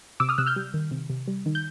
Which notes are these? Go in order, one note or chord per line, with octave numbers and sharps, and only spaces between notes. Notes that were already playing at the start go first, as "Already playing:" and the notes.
C3 D6 E6
D#6 F6
C3 E6 F#6
F6 G6
G3
D#3
C3
C3
G3
D#3
G6